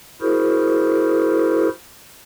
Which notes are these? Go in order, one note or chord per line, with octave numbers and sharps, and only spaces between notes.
E4 F#4 G#4 A#4 C5